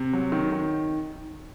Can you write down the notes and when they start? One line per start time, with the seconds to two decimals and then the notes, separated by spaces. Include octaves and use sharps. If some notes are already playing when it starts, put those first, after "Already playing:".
Already playing: C3
0.13 F#3
0.32 D#3
0.52 D#3